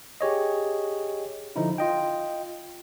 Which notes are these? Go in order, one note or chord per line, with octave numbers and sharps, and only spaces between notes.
G4 G#4 C#5 D#5
D3 F3 D#4 E4
F4 D#5 G5